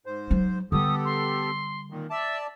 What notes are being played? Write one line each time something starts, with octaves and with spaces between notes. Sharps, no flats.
G#2 C5
F#3 D#4
D3 G3 B3 G4 A4 D#6
C6
A#2 D#3
D5 E5 A5